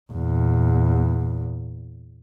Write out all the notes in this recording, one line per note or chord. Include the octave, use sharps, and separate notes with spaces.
E2 A#2